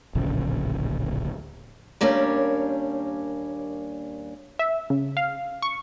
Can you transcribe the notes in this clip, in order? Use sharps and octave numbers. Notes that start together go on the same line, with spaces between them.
D1 A#1 C#3
D#2 G3 A#3 C#4 D4
E5
C#3
F5
C#6